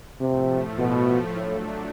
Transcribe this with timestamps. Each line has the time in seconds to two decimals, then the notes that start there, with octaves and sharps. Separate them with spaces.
0.21 A2 C3 F3 A3
0.79 B2
1.37 A2 F#3 A3 D4